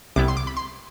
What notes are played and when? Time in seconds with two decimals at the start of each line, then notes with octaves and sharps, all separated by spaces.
0.16 C2 C3 G3 B3 E4 D6
0.28 C6
0.37 D6
0.47 B5
0.57 C6